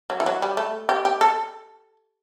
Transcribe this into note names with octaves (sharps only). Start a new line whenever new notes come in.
F#3
E3
F#3
G3
A3
G4
G4
A4